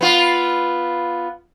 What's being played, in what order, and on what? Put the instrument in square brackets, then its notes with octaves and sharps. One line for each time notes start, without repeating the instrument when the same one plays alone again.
[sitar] B3 F4